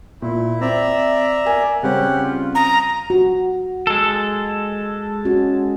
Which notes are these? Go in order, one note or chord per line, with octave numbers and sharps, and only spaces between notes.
A#2 E4
C4 D5 E5 A#5
A#4 G#5
C#3 G3 C4 C#4 G4 F#5
F4
A#5 D#6
F#4
G#3 A4
C#4 F#4